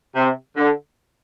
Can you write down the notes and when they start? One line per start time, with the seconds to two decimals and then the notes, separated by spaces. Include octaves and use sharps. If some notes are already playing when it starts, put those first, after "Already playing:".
0.16 C3
0.57 D3